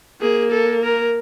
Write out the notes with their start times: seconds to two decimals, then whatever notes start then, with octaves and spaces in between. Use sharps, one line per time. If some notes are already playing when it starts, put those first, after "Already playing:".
0.21 A#3 G#4
0.52 A4
0.83 A#4